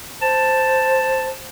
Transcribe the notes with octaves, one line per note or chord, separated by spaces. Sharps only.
C5 A5